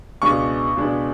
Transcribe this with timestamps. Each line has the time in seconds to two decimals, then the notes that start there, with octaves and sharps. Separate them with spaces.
0.22 C#2 B2 G#3 B3 D4 C#6
0.77 C#2 B2 G#3 B3 D4